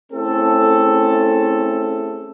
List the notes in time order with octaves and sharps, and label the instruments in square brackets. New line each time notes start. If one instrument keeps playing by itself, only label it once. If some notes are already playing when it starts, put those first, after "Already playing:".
[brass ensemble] A3 C4 C#4 E4 G#4 A4